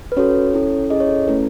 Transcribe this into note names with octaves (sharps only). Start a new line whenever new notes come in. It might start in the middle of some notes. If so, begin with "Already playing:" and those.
B4
C#4 F#4 A4 C#5
C#4 E4 A4
C#4 E4 G#4 D#5
C#5
A4
A3 C#4 E4 A4 B4